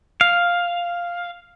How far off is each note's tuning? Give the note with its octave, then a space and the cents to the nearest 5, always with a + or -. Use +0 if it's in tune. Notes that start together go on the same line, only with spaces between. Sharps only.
F5 +0